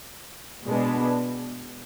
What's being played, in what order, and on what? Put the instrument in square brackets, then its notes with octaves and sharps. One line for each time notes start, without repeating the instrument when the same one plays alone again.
[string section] B2 G#3 B3 D4